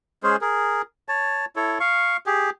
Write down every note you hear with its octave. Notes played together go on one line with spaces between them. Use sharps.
G#3 C#4 G#4 C5
G#4 A#4
C#5 A5
E4 A4 C#5
F5 C#6
G4 G#4